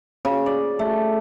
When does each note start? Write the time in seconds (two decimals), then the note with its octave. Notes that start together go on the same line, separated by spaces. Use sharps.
0.25 C#3
0.46 D5
0.79 A3